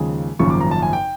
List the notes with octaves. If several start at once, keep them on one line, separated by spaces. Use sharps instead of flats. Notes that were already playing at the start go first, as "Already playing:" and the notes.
Already playing: D#2 C#3 F3 G#3
G#1 F#2 C#3 F3 A#3 C#6
D6
A#5
A5
G#5
G5